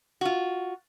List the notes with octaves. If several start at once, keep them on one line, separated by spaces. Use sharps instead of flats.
F4 F#4